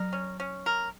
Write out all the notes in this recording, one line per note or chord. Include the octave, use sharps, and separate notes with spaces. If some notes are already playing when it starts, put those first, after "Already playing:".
Already playing: F#3 A#4
C#4
C#4
A#4